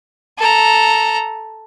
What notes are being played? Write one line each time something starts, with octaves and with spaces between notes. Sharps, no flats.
A4 A#5